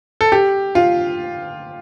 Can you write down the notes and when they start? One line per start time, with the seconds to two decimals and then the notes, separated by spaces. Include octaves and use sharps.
0.21 A4
0.32 G4
0.75 F4